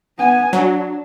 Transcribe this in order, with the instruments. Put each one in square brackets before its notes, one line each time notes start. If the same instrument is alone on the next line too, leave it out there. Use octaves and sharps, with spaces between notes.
[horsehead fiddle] B3 G#5
[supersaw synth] F#3 [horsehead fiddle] D4